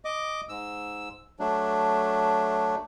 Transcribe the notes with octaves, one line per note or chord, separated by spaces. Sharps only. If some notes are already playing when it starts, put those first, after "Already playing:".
D#5 D6
G#2 E6
F#3 A3 D4